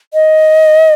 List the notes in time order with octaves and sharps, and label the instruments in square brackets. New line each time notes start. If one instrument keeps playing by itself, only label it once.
[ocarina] D#5